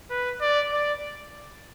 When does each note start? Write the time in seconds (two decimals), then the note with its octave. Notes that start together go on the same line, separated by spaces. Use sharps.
0.10 B4
0.41 D5
0.72 D5